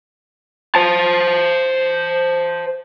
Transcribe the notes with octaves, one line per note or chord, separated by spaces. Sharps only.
C5 A5